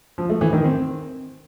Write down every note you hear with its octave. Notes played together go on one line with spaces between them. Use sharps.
F3
A3
E3
D#3
C4